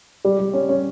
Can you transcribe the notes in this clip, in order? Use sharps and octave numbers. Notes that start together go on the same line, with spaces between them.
G3
G3
C#4
C#4